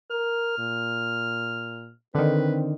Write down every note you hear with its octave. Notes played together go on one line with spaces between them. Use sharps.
A#4 F6
A#2
D3 D#3 C4 B4